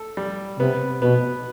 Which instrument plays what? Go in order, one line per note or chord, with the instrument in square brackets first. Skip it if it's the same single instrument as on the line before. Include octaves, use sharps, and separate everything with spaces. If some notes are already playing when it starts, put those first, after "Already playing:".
Already playing: [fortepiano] A4
G3
[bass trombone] C3 [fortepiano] B3
[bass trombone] B2 [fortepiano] B3